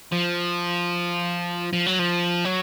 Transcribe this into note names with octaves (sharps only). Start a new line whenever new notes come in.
F3
F3
F#3
F3
F#3